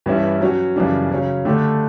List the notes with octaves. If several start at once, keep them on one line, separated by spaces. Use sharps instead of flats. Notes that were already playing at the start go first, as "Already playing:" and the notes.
G2 E3 G3 C#4 E4
F#3 C#4 F#4
F#2 C#3 E3 G3 D4
C#3 F#3 C#4
D3 A3 D4 G4